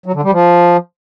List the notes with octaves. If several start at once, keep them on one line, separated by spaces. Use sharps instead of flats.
F#3
D3
G3
F3